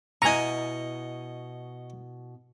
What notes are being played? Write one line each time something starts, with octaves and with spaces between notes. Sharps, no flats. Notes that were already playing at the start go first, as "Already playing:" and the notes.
B2 B3 E4 D#5 G#5 A#5 C#6